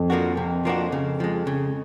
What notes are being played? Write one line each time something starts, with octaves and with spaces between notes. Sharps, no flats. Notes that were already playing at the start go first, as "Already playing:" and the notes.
Already playing: F2
F3 A#3 D4 F#4
C3
F3 A#3 D4 F#4
C#3
F3 G#3
C#3